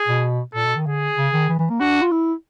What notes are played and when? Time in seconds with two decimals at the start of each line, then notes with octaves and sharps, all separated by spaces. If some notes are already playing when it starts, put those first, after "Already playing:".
Already playing: G#4
0.08 B2
0.54 A#2 A4
0.65 B2
0.76 D#3
0.86 D3 G#4
1.17 C#3
1.34 D#3
1.49 E3
1.59 E3
1.70 A#3
1.80 D4 F#4
2.02 F4
2.11 E4